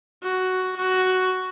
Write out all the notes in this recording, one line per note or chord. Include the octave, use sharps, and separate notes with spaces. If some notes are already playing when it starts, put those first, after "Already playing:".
F#4
F#4